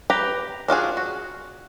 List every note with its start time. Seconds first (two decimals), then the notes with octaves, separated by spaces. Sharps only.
0.10 G4 B4 A#5
0.68 D4 F4 F#4 G#4
0.97 F#4